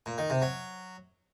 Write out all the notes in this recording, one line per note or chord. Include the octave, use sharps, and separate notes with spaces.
A#2
D#3
C3
F#3